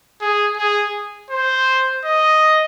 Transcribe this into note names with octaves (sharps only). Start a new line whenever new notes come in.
G#4
G#4
C5
D#5